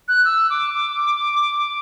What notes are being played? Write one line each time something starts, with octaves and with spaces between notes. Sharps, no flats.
F#6
E6
D6
D6